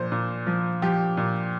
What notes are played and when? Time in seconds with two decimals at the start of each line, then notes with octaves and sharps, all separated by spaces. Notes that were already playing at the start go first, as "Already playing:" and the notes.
Already playing: A#2 F3 C5
0.12 A#2
0.47 F3
0.82 F3 G4
1.17 A#2